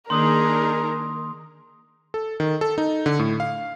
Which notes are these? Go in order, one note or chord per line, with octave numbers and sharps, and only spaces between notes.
D#3 A#3 D4 D#4 G#4 A#4 C6 D#6
A4
D#3
A4
D#4
D3
A2
F5